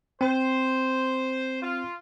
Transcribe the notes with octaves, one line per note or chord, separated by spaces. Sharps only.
C4 C5
F4